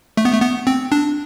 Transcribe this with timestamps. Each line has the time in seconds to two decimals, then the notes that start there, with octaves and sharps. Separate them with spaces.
0.17 A3
0.25 B3
0.33 A3
0.42 B3
0.67 C4
0.92 D4